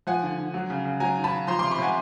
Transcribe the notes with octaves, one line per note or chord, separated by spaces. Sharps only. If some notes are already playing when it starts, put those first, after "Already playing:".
F3 F#5 G#5
D3
D3
F#3
C#3
C#3
F#3 G#5 A#5
D#3
A5 B5
D#3
F3 A#5 C6
C3 C6 D6
B5 C#6
C3 F#5 G#5